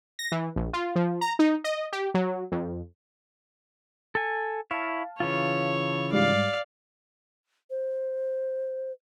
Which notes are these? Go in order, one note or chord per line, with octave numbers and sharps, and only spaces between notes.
A#6
E3
A#1
F4
F3
A#5
D#4
D#5
G4
F#3
F2
A4 G#5
E4 C#5 F5 A5
C#3 E3 F4 C#5
G#2 G3 D5 F5 C7
C5